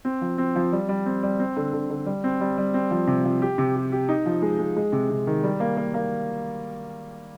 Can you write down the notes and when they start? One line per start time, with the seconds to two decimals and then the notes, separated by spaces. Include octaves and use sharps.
0.05 C4
0.21 F3
0.38 C4
0.56 F3
0.72 G3
0.89 G3
1.06 C4
1.23 G3
1.39 C4
1.56 D3
1.73 D3
1.90 D3
2.06 G3
2.24 C4
2.41 G3
2.58 G3
2.74 C4
2.91 F3
3.07 C3
3.25 F3
3.42 G4
3.58 C3
3.76 G4
3.92 G4
4.09 D#4
4.26 F3
4.42 G#3
4.59 G#3
4.76 G#3
4.92 C3
5.10 C3
5.27 D#3
5.44 G3
5.60 A#3
5.77 A#3
5.94 A#3